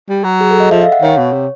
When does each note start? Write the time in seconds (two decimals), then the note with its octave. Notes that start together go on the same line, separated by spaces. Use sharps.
0.09 G3
0.24 F#3
0.41 G#4
0.51 A4
0.60 D#5
0.71 F3 E5
0.82 F5
0.92 F#5
1.02 D#3 C#5
1.17 B2
1.33 C3